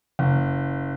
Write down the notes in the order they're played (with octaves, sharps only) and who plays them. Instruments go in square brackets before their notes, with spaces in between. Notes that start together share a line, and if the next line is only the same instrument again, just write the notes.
[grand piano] F#1